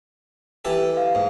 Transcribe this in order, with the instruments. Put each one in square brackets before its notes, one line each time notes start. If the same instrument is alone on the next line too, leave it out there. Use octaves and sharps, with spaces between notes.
[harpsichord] E3 G4 A4
[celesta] F5
[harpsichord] G#2